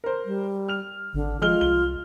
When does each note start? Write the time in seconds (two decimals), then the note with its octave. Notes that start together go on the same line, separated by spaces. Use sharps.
0.04 A#4 C5
0.25 G3
0.68 F6 F7
1.14 G#1 D3
1.42 F3 G#3 F4 F6 G7
1.61 C2 G7